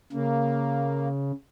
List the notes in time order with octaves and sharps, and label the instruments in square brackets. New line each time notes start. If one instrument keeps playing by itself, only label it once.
[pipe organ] C#3 [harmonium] A#3